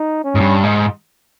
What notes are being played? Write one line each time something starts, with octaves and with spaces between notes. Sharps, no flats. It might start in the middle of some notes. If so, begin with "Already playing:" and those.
Already playing: D#4
C#4
G#2
G2
G#2